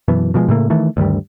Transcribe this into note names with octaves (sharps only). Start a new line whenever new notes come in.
F#2 B2 E3 B3
B2 F3 G3 G#3
A2 C#3 A3 A#3
D#3 E3 A3
D2 G2 D#3 G3